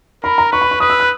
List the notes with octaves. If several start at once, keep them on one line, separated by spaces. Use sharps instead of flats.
A#4 B5
A#5
B4 C#6
B5
C#6
B4 D#6
E6
F#6